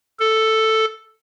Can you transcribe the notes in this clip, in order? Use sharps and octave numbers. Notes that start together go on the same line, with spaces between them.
A4